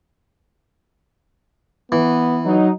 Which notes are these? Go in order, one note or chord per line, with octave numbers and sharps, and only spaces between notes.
E3 B3
F#3 D#4